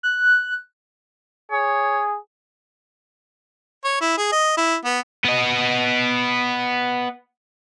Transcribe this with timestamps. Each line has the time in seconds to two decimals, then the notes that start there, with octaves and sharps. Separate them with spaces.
0.03 F#6
1.52 G#4 C#5
3.84 C#5
4.01 E4
4.17 G#4
4.32 D#5
4.57 E4
4.85 B3
5.25 B3 D#5